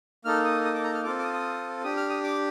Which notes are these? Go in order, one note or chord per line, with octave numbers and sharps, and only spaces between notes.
A#3 D#4 A4 F6
D#6
D#6
D6
A#5
F6
C4 F4 A4 D6
D6
D#6
D#6
D4 G4 D#6
F6
D#6
D6